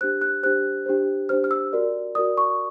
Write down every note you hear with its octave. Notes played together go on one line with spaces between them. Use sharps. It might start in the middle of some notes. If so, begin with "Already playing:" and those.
D4 G4 C5 F#6
F#6
D4 G4 C5 F#6
D4 G4 C5
D4 G4 C5 F6
F6
E6
F#4 A#4 D5
F#4 A#4 D5 D#6
C#6